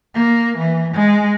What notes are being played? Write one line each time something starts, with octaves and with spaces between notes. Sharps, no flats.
A#3
E3
G#3